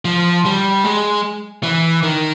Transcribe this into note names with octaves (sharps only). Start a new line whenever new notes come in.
F3
G3
G#3
E3
D#3